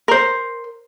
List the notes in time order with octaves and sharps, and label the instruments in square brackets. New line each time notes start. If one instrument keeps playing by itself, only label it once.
[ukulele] A#4 C5